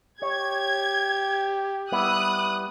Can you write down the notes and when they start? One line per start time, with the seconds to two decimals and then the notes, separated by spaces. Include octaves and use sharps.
0.22 G4 C#5 G#6
1.92 G3 B3 E4 D#6 F#6